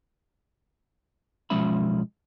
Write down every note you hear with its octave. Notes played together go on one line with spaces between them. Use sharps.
B1 F3 G#3 C#4 E5 B5